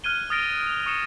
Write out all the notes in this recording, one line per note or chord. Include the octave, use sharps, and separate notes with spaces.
F6 F#6 G#6 D#7 G7
D#6 F6 A6 A#6 D7 F7
D7 F7
C#6 D#6 C#7 E7